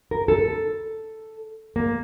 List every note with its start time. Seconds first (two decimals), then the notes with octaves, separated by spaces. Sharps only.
0.11 A#4
0.28 A4
1.76 A#3